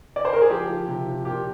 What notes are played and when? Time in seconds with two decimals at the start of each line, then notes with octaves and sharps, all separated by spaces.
0.16 D5
0.25 C5
0.33 A#4
0.41 G#4
0.50 F3 G4
0.69 F3
0.88 C3
1.07 F3
1.25 A#2 G4